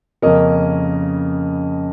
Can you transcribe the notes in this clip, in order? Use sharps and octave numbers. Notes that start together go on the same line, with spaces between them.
F2 C#3 A#3 C#4 A#4 D#5